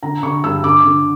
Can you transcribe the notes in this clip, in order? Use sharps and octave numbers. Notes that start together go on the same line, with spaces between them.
D3 A#5
D3 C#6
G2 E6
D3 D6
D3